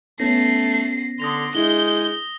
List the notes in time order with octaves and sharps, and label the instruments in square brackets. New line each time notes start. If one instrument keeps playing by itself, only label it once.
[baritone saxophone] A3 [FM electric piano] B3 C#4 [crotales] A#6 [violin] C7
[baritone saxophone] D3 [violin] C6 [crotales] D#6 A#6 F7
[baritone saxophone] G#3 [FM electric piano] D4 E4 [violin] G6 [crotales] G7